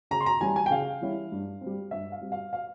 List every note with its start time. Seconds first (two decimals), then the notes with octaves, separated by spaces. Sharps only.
0.11 C#3 A#5
0.21 C6
0.26 A#5
0.41 E3 G3 C#4 E4 G#5
0.56 G#5
0.66 G5
0.71 C#3 F5
1.01 E3 G3 C#4 E4
1.32 G2
1.61 C4
1.66 G3
1.91 G2 E5
2.12 F5
2.21 G3 C4
2.32 F5
2.53 F5